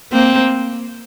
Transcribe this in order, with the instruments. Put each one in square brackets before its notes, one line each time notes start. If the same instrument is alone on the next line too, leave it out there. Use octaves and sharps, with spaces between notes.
[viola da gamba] A#3 C4